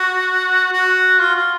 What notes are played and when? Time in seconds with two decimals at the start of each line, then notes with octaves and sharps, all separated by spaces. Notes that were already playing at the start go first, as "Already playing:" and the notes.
Already playing: F#4
0.72 F#4
1.20 F4
1.36 F4